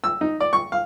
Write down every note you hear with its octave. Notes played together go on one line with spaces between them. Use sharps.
E6
D#4
D5
C#6
F5